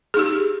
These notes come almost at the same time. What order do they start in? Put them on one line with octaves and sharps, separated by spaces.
G#4 D#4 G4